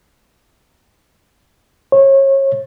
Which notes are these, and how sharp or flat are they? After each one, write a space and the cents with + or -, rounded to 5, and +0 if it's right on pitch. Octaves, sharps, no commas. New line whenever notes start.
C#5 -30